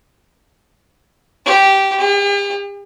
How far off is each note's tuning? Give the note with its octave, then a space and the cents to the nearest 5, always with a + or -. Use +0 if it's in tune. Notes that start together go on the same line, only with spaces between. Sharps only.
G4 -10
G4 +45